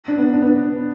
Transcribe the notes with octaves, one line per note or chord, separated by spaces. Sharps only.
D4
B3
D4
B3